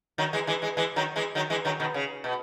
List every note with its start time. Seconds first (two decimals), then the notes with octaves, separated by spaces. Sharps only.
0.18 D#3 F#3
0.33 E3 G#3
0.47 E3 G#3
0.62 E3 G#3
0.77 E3 G#3
0.96 D#3 F#3
1.16 E3 G#3
1.35 D#3 F#3
1.50 E3 G#3
1.65 D#3 F#3
1.80 B2 D#3
1.94 C#3
2.24 B2